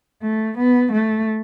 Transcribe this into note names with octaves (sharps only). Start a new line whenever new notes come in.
A3
B3
A3